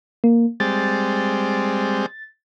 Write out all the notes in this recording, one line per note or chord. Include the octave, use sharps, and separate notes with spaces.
A#3
G3 G#3 C4 A6